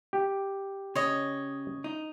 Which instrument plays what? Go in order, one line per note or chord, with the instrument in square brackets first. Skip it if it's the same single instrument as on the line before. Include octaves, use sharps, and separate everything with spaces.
[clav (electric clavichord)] G4
[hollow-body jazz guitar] C#3 [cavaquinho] C#5 D#5
[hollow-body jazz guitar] D#4